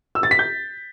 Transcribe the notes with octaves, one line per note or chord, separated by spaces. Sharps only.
E6
A6
B6
G6